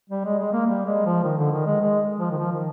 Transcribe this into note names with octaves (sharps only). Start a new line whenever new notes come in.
G3
G#3
G#3
A#3
G3
G#3
F3
D#3
D3
D#3
G#3
G#3
F3
D#3
F3
D#3